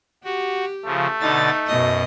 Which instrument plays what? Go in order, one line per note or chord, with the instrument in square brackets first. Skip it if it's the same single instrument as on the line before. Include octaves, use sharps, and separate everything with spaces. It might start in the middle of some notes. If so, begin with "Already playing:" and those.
[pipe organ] F#4 [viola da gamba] G4
[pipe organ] C#3 F3 [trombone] A3
[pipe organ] B2 D3 A6 [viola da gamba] D#4
[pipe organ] F#2 [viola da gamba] B2 D#5